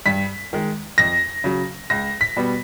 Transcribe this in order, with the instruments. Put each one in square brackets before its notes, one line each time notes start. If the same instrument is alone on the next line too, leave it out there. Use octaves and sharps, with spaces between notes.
[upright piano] G2 B6
D#3 G#3
F2 A#6
C#3 F#3
C#2 A#6
B6
B2 G3 B3